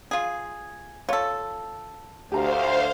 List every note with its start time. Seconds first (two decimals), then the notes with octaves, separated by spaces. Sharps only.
0.11 F4 G#4
1.09 F4 A4 C#5
2.32 D2 G4 C5 F5 A#5